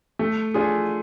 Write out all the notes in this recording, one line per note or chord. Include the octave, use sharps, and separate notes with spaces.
A3
D4 F4 G#4